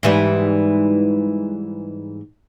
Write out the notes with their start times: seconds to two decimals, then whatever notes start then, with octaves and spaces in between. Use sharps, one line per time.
0.03 G#2 E3 G3